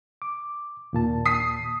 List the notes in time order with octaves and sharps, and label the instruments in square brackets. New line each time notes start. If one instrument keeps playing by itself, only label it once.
[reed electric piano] D6
D#2 A#2 A5
[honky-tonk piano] D#6 B6 C7